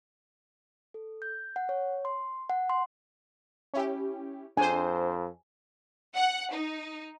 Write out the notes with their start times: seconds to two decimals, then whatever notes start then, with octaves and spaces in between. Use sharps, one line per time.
0.94 A4
1.22 G6
1.56 F#5
1.69 C#5
2.05 C6
2.50 F#5
2.70 C6
3.74 C#4 E4 G4
4.57 F2 D4 C5 G#5
6.16 F#5
6.53 D#4